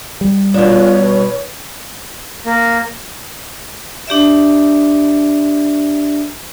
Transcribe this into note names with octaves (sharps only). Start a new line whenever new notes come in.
G3
B2 D4 F4 C#5
B4
A#3
D4 G4 D5 E5